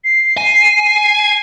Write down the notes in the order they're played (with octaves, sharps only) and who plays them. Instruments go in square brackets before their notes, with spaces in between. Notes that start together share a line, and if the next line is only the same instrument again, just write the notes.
[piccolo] C7
[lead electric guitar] G#5